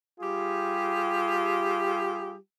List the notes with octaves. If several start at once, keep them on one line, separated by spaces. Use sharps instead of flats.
G3 F4 G4 G#4